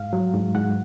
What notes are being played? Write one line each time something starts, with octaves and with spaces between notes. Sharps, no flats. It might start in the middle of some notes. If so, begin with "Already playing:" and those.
Already playing: G#2 F5
F#3
G#2
G#2 F#5